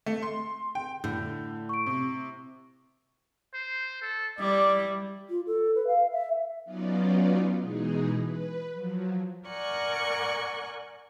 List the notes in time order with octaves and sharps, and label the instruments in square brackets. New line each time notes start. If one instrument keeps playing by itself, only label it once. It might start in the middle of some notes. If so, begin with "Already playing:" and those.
[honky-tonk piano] A3
C6
G5
[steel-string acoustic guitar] A2 [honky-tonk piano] D3 [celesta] G6
[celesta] C#6 D7
[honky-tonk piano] C3
[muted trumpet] C5
A4
[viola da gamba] G3 [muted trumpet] E4 [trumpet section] D5
[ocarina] F4
A4
B4
F5
E5
[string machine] F#3 B3 C#4 D#4 F4 D5
B2 E3 G#3 D#4 G#4
B4
F3 F#3
[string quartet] A#4 D5 F#5 G#5 C#6 F#6